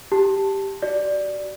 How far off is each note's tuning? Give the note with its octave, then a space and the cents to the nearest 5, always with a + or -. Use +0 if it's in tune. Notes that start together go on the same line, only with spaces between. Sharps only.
G4 +0 A5 +0
F#4 +20 D5 +0